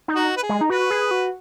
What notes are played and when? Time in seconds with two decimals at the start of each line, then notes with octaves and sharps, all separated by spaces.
0.08 D#4
0.15 F#4
0.37 B4
0.43 G#4
0.49 G#3
0.61 D#4
0.70 F#4 B4
0.90 G#4
1.11 F#4